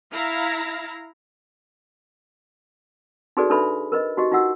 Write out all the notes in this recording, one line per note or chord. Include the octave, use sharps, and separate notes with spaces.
E4 F5 A#5
D#4 F#4 G#4 A4 B4 D5
D4 D#4 A4 B4 E5 B5
A#4 B4 D#5
D#4 F#4 G4 D#5
D#4 F4 F#4 F#5 E6